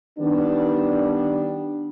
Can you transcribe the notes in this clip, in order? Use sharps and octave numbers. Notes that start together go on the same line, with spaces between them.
D#3 G3 B3 D4